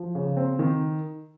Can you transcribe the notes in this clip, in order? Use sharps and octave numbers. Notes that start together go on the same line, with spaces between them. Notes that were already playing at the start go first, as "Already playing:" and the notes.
Already playing: F3
C#3
C4
D#3